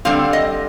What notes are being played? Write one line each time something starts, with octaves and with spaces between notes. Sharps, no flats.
D3 G3 C4 F5
D#5